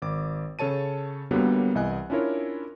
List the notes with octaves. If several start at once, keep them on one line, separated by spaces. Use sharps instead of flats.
G#1 D6
C#3 A4 C#5 A5 D#7
F#2 D3 F#3 G3 A#3 B3
C2 E3 D#5 F#5 G#5 F#6
C#4 D4 E4 F4 A#4 C#5